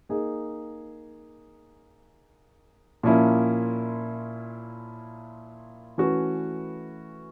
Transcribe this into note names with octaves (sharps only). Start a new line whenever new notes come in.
A#3 D#4 G#4
A#2 F3 A#3 C#4 E4
E3 A3 C#4 F#4 B4